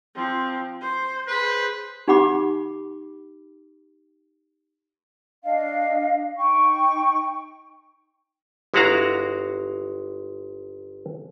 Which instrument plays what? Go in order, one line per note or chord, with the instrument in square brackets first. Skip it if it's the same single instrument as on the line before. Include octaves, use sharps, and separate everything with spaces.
[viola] F3 C4
C5
[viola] G#4 C5 [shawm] B4
[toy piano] D#4 G4 F#5 B5 D6
[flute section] D4 D#5 F5
D#4 G5 C#6
[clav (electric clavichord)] G1 G#3 E4 F#4 F5 A#5